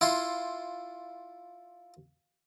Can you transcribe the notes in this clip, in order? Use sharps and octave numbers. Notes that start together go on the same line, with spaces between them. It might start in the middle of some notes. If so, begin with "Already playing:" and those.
E4 F4 C6